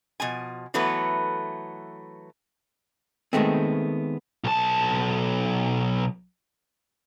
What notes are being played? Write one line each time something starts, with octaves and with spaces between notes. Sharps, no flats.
B2 F3 G#5
E3 F#3 A3 B3 B4
D#3 G#3 A3 B3 C4
B1 A5